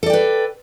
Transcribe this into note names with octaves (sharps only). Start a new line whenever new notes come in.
A4 B4 D5 G5